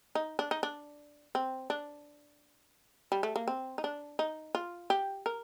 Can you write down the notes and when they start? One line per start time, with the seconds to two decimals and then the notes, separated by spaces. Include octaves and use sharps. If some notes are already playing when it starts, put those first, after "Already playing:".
0.15 D#4
0.39 D4
0.51 D#4
0.63 D4
1.35 C4
1.70 D4
3.12 G3
3.23 A3
3.36 A#3
3.48 C4
3.78 D#4
3.84 D4
4.19 D#4
4.55 F4
4.90 G4
5.26 A#4